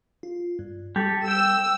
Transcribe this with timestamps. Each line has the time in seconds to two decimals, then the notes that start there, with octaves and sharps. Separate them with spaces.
0.23 F4
0.59 G2
0.96 G3 G4 A4
1.28 G5 E6